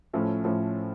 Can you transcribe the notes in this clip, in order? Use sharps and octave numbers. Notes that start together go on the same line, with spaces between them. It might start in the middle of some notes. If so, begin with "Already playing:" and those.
A2 F3 A3 C#4
A2 F3 A3 C#4